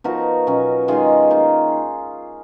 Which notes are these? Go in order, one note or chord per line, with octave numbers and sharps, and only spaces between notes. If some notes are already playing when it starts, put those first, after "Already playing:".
F3 B3 D#4 F#4 A#4
B2 F#3 C#4
D#3 G#3 D#4 F4 G#4
D#3 A#3 D#4